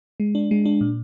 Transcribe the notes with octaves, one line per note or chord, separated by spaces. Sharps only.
G#3
D4
G#3
D4
A#2